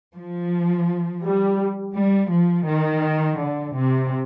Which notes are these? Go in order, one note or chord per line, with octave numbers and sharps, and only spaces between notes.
F3
G3
G3
F3
D#3
D3
C3